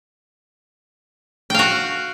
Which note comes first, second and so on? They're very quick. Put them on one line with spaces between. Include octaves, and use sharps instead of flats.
G5 F5 F#4